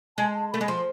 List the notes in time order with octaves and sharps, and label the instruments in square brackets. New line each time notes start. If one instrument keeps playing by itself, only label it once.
[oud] G#3 [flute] A5
[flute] A5
[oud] A3 [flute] B5
[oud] G#3
[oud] F3 [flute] C6